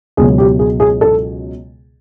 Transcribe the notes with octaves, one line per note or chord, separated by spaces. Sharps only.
C#2 B2 F#3 G#4
G4
G#4
G#4
A4